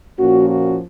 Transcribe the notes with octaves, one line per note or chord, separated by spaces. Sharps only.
A#2 F3 A#3 C#4 F#4
F#4